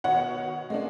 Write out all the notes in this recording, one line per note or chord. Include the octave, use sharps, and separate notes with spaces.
B2 D#3 C#5 F#5
G#3 A#3 D4